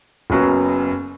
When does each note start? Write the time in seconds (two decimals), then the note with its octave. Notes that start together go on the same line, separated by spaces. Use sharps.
0.30 F#1 F#2 F#3 B3